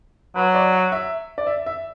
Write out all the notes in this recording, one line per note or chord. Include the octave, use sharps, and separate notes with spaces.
F#3 B4
D5
F#5
E5
D5
E5
E5